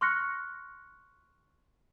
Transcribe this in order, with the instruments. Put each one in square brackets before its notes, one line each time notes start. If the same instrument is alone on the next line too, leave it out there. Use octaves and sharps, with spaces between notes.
[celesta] C6 C#6 F6 F#6 A#6 C#7